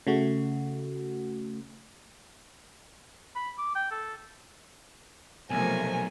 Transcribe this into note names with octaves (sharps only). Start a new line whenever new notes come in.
C#3 A3 F#4
B5
D6
G5
A4
B1 C3 F3 A3 A#4 G#5